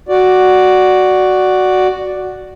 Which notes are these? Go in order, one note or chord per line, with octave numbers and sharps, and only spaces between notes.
F#4 D5